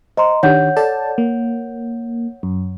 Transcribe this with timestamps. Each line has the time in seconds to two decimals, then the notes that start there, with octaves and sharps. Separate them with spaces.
0.17 C5 D#5 A#5 C6
0.43 D#3 D4 G4 C#5 F#5 G6
0.77 A4 D5 A5
1.18 A#3
2.43 F#2